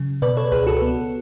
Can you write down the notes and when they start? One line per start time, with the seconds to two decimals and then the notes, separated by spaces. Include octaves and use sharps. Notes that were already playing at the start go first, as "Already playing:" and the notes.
Already playing: C#3 F#3
0.22 B2 B4 D5
0.37 A4 C#5
0.52 C#2 G#4 B4
0.67 F#4 A4
0.82 B3